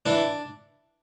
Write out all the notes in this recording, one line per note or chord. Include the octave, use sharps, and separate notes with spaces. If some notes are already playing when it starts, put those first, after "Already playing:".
E3 D4